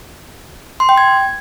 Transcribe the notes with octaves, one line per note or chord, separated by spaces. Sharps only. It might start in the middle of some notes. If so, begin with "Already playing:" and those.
C6
G5
G#6